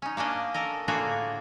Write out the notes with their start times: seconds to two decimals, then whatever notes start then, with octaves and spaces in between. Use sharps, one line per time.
0.02 C#4 D#4
0.17 A#3 C#4 D4 D#5
0.54 A4 A#4 D#5
0.88 A2 D3 A#3 F4 F#4 G#4